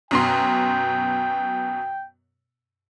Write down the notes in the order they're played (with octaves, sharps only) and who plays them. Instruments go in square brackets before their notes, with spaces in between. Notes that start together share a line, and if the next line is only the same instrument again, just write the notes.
[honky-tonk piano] F#2 B2 C6 [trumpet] G5